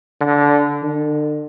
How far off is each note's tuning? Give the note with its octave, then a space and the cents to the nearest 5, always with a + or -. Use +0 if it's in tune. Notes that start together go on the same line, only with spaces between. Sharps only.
D3 -15
D3 +35